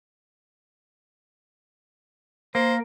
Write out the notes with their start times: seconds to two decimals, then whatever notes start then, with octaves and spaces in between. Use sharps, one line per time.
2.55 A#3 C5